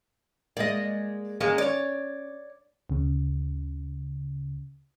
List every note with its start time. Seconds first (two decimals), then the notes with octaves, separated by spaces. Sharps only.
0.57 G#3 A#3 D5 D#5
1.40 G#3 A#3 C#4
1.58 C#5 D5
2.90 D2 C#3